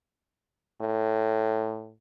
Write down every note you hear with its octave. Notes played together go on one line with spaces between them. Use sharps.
A2